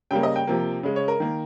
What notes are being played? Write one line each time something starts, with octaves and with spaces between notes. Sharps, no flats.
C#3 G3 A#3 G5
D#5
G5
C3 F3 A#3
C#3 G#3
C#5
A#4
D#3 A#3